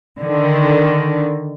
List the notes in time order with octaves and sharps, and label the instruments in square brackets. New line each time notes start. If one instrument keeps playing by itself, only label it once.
[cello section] D3 D#3